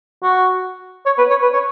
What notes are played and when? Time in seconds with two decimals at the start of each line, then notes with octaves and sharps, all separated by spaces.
0.24 F#4
1.06 C#5
1.18 B4
1.30 C#5
1.42 B4
1.53 C#5